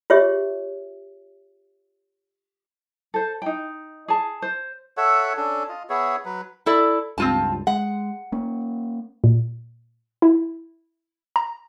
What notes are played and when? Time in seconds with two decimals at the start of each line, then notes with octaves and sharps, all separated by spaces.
0.10 F4 G4 G#4 C#5 E5
3.14 A4 C5
3.42 D#4 G5
4.08 G#4 A5
4.42 C5
4.97 A4 C#5 E5 F#5
5.37 C#4 D4 A4
5.69 F4 D#5
5.90 B3 G#4 C#5 E5
6.25 F#3 B4
6.66 E4 A4 D5
7.18 C#2 G2 C4 F4 A5
7.67 G#3 F#5
8.32 A#3 C#4
9.24 A#2
10.22 E4
11.36 A#5